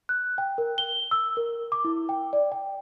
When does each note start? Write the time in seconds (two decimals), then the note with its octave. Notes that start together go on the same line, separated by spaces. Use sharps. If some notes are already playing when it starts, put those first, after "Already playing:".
0.09 F#6
0.38 G5
0.58 A#4
0.78 G7
1.11 E6
1.37 A#4
1.72 D6
1.85 E4
2.09 G5
2.33 D5
2.52 G5